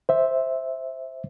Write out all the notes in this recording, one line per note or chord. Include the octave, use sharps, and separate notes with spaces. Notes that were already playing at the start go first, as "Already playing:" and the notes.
C5 E5